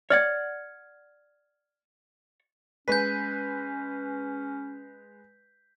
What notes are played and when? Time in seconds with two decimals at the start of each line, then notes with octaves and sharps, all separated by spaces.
0.10 C#5 D5 F#5 F6 G#6
2.88 G#3 C#4 B4 G6 B6